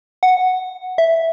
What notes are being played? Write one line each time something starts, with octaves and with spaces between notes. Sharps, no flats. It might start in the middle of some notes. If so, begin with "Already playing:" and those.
F#5
E5